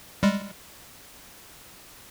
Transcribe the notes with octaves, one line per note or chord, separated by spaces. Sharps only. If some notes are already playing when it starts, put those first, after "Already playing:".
G3 G#3